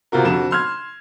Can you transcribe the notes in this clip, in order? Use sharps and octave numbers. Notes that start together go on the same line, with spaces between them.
C3 F4 F#4 A#4
F2 D3 F#4 E7
C6 F6 G#6